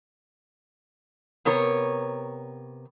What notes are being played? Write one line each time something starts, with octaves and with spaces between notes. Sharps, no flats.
C3 B3 A#4 C#5